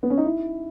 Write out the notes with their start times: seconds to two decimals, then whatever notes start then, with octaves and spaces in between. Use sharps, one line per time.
0.03 B3
0.10 C#4
0.18 D#4
0.24 E4